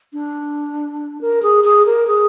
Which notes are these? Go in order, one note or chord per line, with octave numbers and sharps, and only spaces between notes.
D4
A#4
G#4
G#4
A#4
G#4